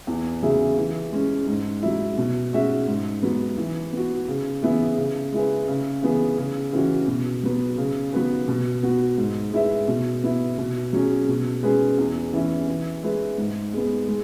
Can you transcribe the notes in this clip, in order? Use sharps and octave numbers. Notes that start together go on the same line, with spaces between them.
E2
C#3 F#3 E4 G#4
E3
G#3 C#4
G#2
F#3 E4
B2
G#3 C#4 F#4 E5
G#2
F#3 B3
E3
B3 F#4
C#3
E3 B3 E4 G#4
C#3
G#3 E4 G#4 B4
C#3
E3 B3 G#4
C#3
E3 C#4 F#4
B2
F#3 B3
C#3
F#3 B3 F#4 B4
B2
B3 F#4
G#2
G#3 E4 B4 E5
B2
B3 E4
B2
F#3 C#4 G#4
B2
G#3 C#4 G#4 B4
E2
E3 C#4 E4
E3
G#3 E4 B4
G#2
G#3 B3
G#3